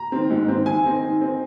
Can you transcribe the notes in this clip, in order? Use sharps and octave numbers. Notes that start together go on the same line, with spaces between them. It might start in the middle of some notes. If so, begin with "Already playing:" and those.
Already playing: A#5
D#3 C4
G#2
D#3 C4
D#3 G#5
C4 D#4
D#3
C4 D#4